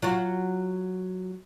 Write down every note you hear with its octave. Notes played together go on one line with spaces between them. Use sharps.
F#3 F4 F#4